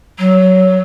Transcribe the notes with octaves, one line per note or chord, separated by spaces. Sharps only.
F#3